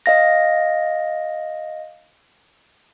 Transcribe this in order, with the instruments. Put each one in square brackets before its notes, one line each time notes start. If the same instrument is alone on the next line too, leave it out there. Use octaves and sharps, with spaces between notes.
[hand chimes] D#5 F5 A#6